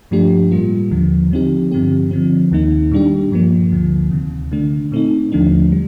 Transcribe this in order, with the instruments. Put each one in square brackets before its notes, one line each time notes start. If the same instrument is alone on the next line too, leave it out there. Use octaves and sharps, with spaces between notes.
[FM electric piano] G2 F3 A3 D4 G4
A2 G3 A#3 F4
D#2 D3 F3
D3 F3 C4 D#4 G4
G2 D3 F3 C4 G4
D3 F3 C4
D#2 D#3 A#3 D#4
A#2 G3 D4 G4
G2 F3 A#3
D2 D3 F3
D2 C3 D#3
D3 A3 D4
A#2 A3 C4 D#4
D#2 D3 F3 A3 D4
G3